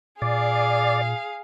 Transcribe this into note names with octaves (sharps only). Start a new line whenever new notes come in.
A#2 G#4 D5 F5